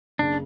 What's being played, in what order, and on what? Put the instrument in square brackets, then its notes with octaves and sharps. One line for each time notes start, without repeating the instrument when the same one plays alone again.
[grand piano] F#1 C#3 [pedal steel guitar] D4